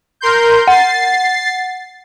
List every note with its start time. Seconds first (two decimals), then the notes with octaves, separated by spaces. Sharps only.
0.21 A#4 C6 G6
0.68 F#5 A6 C7